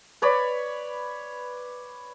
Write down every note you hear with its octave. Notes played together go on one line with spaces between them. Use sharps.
B4 C#5 D5 B5